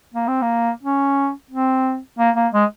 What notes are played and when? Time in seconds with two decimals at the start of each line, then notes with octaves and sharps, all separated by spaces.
0.14 A#3
0.28 C4
0.42 A#3
0.83 C#4
1.51 C4
2.19 A#3
2.36 A#3
2.53 G#3